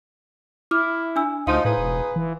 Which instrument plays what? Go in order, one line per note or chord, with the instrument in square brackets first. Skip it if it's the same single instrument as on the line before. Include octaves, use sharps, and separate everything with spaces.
[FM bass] E4 [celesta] D6 F6
[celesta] D4 G#5 E6
[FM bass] D2 [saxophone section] F3 D#4 [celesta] F5 C6
[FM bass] A2 [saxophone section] D#4 G#4 B4
[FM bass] E1
E3